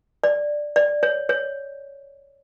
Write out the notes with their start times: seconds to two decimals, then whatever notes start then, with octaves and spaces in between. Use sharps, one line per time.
0.24 D5
0.76 D5
1.03 C#5
1.29 C#5